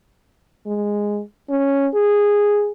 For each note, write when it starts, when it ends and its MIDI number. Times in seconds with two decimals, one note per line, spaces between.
0.66 1.21 56
1.50 1.87 61
1.94 2.72 68